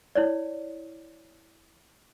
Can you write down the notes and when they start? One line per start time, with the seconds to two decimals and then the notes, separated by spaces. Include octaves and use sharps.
0.15 E4 C#5 D5